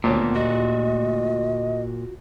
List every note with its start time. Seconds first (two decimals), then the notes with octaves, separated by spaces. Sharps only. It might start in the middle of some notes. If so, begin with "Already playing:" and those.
0.04 D#1 D2 A#2 B3 C5 C#5 A5
0.35 F4 F#4 D#5